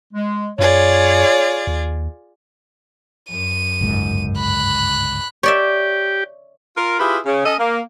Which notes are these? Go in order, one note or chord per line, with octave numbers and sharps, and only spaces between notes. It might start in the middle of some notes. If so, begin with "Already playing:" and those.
G#3
F#2 F4 G#4 C#5 D5
D#2
F#2 D#7
G1 C#2 G#2
B5 F#6
G4 C#5 D5 E5
F4 A#4
E4 F4 G4 G#4 B4
C#3
C#4 A4 D#5
A#3